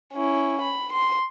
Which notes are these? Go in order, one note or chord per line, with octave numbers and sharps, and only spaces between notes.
C#4 E4
B5
C6